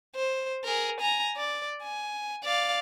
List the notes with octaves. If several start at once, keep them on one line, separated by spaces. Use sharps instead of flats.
C5
G#4 A#4
G#5 A#5
D5
G#5
D5 F5